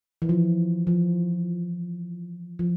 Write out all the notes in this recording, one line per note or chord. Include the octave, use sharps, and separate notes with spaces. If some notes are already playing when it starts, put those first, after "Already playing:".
E3
F3
F3
F3